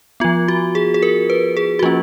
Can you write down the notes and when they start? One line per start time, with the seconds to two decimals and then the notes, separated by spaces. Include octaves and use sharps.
0.20 F3 B3 F4
0.48 F#4
0.75 G#4
0.94 G#4
1.03 A#4
1.30 B4
1.57 G#4
1.79 F#4
1.83 F3 A#3 C#4 F4